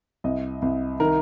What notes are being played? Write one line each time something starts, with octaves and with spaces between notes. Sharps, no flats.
C2 D#5
C2
D#3 A#4